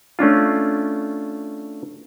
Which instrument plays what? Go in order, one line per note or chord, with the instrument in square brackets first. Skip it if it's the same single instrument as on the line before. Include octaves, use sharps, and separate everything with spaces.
[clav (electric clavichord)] A3 C#4 D4 F4